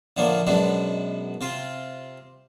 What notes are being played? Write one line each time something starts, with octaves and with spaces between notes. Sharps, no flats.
A2 D3 F3 A#3
F#2 B2 G#3 D4
C3 F4